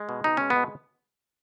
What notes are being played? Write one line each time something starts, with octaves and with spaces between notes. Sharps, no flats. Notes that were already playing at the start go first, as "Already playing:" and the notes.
Already playing: G#3
B2
B2 D#4
G#3 C#4
B3
B2